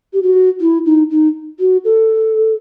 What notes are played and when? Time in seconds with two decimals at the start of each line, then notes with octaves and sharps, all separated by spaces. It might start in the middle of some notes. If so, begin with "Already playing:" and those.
0.13 G4
0.23 F#4
0.61 E4
0.86 D#4
1.10 D#4
1.60 F#4
1.85 A4